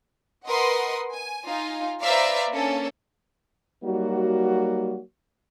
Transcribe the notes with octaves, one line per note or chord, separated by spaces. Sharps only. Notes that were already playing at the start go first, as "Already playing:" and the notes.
A#4 B4 D#5 F#5 C6 D#6
G#5
D#4 F4 F5 G#5
B4 C5 D5 E5 F5 A#5
A#3 C#4 D4 A4
F#3 G3 A#3 D#4 F#4